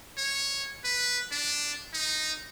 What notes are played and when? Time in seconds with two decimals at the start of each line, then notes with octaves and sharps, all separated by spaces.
0.17 C#5
0.84 B4
1.31 D4
1.93 D#4